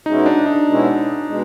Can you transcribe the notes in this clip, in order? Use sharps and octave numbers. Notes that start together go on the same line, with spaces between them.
B2 G#3 C#4 D#4 E4
D4
D#4
B2 G#3 C#4 E4
B2 G#3